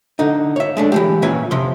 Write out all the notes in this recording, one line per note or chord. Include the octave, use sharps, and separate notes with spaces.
D3 D#4
C#5 E5
G#3 A3 D4
E3 G#3 G4
A#2 C#4 B4 E5 G#5
C3 F3 C6